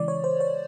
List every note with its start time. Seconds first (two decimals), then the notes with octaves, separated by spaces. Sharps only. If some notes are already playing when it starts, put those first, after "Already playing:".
Already playing: C#3 E3 G#3 D5
0.08 C#5
0.24 C5
0.40 C#5